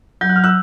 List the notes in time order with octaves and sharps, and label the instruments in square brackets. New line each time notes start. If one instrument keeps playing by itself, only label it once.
[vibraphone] F#3 [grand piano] G6
[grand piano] F#6
F6
E6 F#6